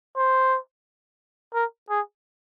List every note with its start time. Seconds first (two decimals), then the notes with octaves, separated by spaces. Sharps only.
0.16 C5
1.54 A#4
1.90 G#4